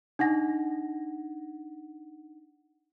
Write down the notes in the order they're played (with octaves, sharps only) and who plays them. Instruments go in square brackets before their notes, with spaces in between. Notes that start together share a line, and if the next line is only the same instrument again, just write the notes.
[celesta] D4 D#4 F#5 A#6